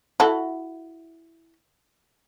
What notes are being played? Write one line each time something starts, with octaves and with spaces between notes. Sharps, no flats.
E4 F#4 A4